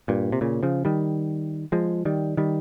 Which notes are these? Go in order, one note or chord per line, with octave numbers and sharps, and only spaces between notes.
G2 A#2
C3
A#2 C#3
C#3 F3
D#3 G3
F3 G#3
D#3 G3
D#3 G3